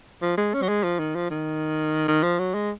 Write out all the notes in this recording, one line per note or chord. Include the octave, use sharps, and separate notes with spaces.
F3
G#3
C#4
F#3
G#3
F3
D#3
F3
D#3
D#3
F3
F#3
G#3